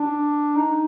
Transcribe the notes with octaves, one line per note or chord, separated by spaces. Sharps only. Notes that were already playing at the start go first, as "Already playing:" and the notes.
Already playing: D4
D#4